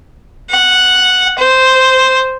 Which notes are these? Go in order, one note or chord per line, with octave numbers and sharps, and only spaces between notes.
F#5
C5